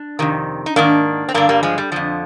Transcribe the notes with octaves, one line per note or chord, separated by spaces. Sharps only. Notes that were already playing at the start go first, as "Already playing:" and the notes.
Already playing: D4
F2 C3 D#3
D#4
G#2 D#3 A#3 D4
C4
G2 D3 A#3 D4
G3 A#3
F3 G#3
G3
F2 D3 F3